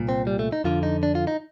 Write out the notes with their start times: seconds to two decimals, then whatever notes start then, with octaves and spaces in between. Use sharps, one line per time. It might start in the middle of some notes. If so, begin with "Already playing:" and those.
Already playing: C2 A#2
0.09 C4
0.27 G3
0.39 A3
0.52 D#4
0.64 F2 D3 F4
0.83 D#4
1.03 D4
1.15 F4
1.27 D#4